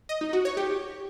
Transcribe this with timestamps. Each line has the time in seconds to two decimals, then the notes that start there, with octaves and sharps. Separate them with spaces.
0.09 D#5
0.21 D#4
0.33 F#4
0.45 C#5
0.57 G4